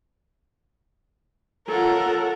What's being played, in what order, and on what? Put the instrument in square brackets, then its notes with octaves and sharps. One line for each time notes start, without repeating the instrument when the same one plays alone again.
[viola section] F4 C#5 [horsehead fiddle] A4 F#5 [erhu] A#4